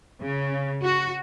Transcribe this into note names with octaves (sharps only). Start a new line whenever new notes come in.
C#3
F#4